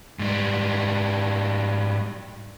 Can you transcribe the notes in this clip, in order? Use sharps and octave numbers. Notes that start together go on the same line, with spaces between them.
G#2 G3